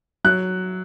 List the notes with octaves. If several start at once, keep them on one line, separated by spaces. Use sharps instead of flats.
F#3 F#6